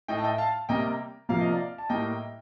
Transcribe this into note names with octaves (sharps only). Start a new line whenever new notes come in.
A2 A3 D#5 G5
A5
D#5 G5
F5 A5
C3 G3 A#3 D#5 G5
C3 F3 A#3 F5
D#5
D5 F5
A5
A2 G3 A#3 D#5 G5